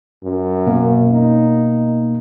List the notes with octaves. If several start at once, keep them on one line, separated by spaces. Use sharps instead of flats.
F#2
B2 A#3
D#4